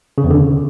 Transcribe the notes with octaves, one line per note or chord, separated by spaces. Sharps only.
C#3
E2
D3
C#3